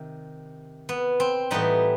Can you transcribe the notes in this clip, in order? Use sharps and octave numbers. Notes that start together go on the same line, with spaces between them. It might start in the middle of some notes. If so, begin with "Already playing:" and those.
Already playing: C3 D#3
B3
C4
A2 E3 G3 B3 D#4